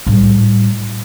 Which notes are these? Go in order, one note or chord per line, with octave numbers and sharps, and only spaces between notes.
A2 G3